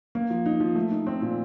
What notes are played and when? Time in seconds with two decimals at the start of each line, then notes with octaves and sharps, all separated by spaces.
0.15 A#3
0.30 F3
0.46 D#4
0.60 F3
0.75 A3
0.91 D#4
1.07 C4
1.22 A#2